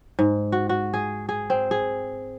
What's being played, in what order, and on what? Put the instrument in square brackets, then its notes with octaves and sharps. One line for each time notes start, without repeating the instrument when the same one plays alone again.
[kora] G#2
F#4
F#4
G#4
G#4
C4
G#4